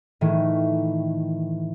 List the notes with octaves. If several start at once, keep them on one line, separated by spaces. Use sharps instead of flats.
A2 D#3 E3 A3